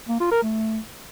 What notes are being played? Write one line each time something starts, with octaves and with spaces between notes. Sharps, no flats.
A#3
F4
A#4
A3